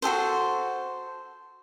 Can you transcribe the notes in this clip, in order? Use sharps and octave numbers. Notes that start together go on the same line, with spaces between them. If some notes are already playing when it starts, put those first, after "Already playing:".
F#4 G#4 A4 C5